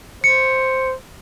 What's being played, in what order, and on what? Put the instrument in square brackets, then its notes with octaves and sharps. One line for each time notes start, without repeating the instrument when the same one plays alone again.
[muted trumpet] C5 [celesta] C#7